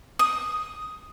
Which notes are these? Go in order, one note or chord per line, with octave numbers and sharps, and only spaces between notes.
D#6